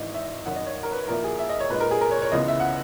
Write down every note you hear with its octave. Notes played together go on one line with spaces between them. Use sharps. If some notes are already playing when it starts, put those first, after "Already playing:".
Already playing: G#1 G#2 E3 D#5
E5
G#1 F#2 D#3 F#5
D#5
C#5
A#4
B4
A#1 A#2 A#3 E4 A#4
G#4
E5
D#5
C#5
A#2 G#3 D#4 B4
A#4
G#4
A#4
C#5
C#5
C#2 C#3 E3 G#3 B3 D#5
E5
F#5